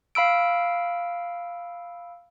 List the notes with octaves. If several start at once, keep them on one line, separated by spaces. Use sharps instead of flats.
F5 B5 E6 D7